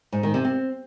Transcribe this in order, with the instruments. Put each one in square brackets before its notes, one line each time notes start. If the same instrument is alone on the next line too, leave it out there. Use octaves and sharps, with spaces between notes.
[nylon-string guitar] G#2
D#3
C3
C4